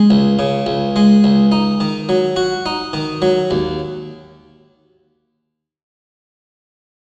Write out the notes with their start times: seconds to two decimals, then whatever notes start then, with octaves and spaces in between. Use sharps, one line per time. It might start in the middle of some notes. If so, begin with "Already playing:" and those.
Already playing: G#3
0.10 C#2
0.39 C#3
0.66 C#2
0.96 G#3
1.24 C#2
1.52 D#4
1.80 D#3
2.09 F#3
2.36 F#4
2.66 D#4
2.93 D#3
3.22 F#3
3.51 D#2